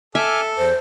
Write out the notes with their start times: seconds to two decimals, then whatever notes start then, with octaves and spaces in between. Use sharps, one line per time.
0.15 A4 E5 G#5 D6 F6
0.57 E2 C5